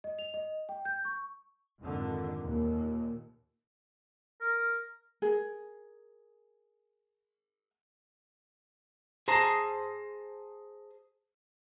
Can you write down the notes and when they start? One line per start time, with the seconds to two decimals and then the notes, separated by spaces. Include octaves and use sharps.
0.04 D#5
0.19 F7
0.34 D#5
0.69 G5
0.85 G6
1.05 C#6
1.80 F2 G#2 D3 D#3
2.40 D#2 A#2
4.41 A#4
5.22 G#4 A#4
9.28 G#4 C5 A5 A#5